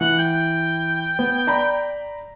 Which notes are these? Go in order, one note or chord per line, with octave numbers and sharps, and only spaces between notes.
E3 F#5
G5
B3
D5 A#5 B5